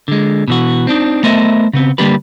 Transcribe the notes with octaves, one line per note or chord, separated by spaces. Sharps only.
D3 G#3
B2 E3 F#4
C4 D4 D#4
A3 B3 A#4 C5 D#5 E5
C#3 B3 C4
D3 G3 A#3 D4 G4 B4